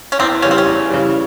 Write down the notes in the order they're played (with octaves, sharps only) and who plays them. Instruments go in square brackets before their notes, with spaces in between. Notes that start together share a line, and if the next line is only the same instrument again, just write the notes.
[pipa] C#4
[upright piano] E2 [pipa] C4
[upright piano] C#3 E3 G3 [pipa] C#4
[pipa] C4
C#4
[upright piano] E2
C#3 E3 G3